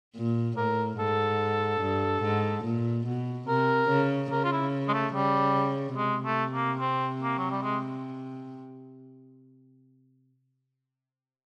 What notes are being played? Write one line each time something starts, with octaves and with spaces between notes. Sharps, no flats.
A#2
A2 A#4
G#2 A4
G2
G#2
A#2
B2
C3 A#4
C#3
C#3 A#4
F4
E4
G#3
A3
C#3 G3
C3 G#3
A3
A#3
C4
A#3
F#3
G3
G#3